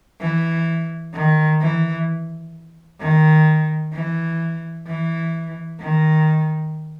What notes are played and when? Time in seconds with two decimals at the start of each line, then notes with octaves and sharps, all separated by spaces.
0.20 E3
1.13 D#3
1.60 E3
3.00 D#3
3.93 E3
4.86 E3
5.79 D#3